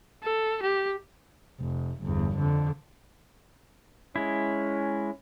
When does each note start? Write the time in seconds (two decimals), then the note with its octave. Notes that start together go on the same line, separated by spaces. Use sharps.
0.23 A4
0.62 G4
1.60 F1
2.03 G1 E2
2.38 F2 D3
4.16 G#3 C#4 E4